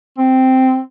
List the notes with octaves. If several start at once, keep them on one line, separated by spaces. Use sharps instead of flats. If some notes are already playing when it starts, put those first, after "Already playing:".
C4